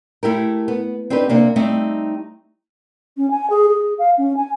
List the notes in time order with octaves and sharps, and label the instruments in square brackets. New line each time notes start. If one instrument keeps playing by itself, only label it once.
[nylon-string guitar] A3 E4 G4 A#4
B3
C4 D4 D#4 G4 B4
C3 A#3 D4
G3 A3 C4 D#4
[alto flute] C#4
G#5
G#4
G#4
F5
C#4
G#5